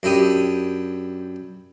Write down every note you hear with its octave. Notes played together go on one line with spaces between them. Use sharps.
F#2 D4 E4 G4 D#6